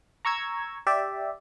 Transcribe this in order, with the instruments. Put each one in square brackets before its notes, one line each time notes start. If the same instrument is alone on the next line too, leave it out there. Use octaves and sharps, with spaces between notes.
[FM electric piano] A#5 C#6 E6 G#6
G4 D5 E5